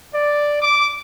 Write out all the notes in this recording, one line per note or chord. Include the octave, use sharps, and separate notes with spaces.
D5
D6